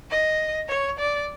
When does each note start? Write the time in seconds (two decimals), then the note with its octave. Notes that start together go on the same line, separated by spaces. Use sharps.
0.11 D#5
0.69 C#5
0.99 D5